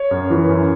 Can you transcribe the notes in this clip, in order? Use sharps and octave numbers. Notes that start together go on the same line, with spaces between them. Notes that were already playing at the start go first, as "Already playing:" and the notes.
Already playing: C#5
F#2
E3
F#2